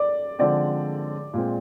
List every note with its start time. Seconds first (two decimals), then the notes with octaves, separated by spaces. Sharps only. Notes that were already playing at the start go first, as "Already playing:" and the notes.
Already playing: D5
0.39 D3 F3 G#3 C4 D5
1.33 A#2 G#3 C4